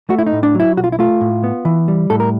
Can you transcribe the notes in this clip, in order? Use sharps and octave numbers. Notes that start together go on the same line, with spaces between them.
A3 F#4
E4
D#4
A2
D4
F#3
E4
B1 F#4
F4
E4
A3 F4
A2
B3
E3
G3
A2 A4
A#4